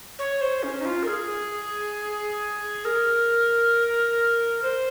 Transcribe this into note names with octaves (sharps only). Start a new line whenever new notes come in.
C#5
C5
C#4
D#4
F4
A#4
G#4
A#4
C5